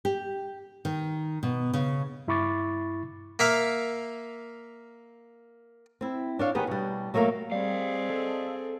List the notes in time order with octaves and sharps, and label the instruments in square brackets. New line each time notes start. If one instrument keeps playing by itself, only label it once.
[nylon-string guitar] G4
D#3
B2
C#3
[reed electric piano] G2 E4 B5 C#6 D6 A6
[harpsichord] A#3 E5 F5
[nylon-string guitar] C4 E4
D4 C#5 F5
D#3 B3 G4 G#4 B4
B2 G3
F#3 A3 A#3 C5 F5
[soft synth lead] G3 [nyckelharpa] C4 G#4 [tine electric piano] D5 [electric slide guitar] D#5 F5
[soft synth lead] A4